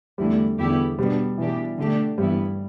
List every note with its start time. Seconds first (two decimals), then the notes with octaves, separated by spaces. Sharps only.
0.18 E2 D3 G3 A3 E4
0.58 E2 D3 B3 E4 G4
0.99 B2 G3 B3 D4
1.38 B2 E3 G3 D4 G4
1.78 D3 A3 D4 G4
2.18 G2 E3 G3 B3 E4